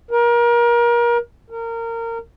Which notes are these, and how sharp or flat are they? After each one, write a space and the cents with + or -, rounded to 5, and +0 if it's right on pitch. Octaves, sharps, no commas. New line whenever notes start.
A#4 +30
A#4 -25